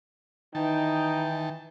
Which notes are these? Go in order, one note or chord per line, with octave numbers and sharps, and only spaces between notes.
D#3 E3 D#4 G5 A5